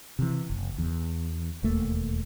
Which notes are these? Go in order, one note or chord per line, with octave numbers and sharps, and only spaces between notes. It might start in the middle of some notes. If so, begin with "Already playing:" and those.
C3 E3
F#1
E2
E1 D#2 A3 A#3